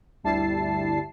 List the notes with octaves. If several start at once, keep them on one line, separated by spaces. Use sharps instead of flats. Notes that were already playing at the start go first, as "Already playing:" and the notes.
G1 D2 G3 E4 A5 C7